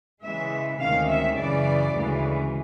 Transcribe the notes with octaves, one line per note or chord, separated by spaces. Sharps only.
C#3 E3 G#3 E5
D2 C3 D#3 G#3 C#4 F5
E5
F#2 C#3 E3 D5
D2 C#3 E3 G#3